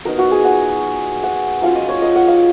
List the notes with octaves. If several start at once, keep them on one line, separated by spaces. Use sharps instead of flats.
F#3 B3 D#4 A#4
F#4
G#4
F#5
F#5
F#3 C#4 F4 F5
D#5
C#5
D#5
F#5
F5